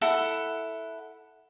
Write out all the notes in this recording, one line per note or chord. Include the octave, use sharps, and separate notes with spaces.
E4 A4 F#5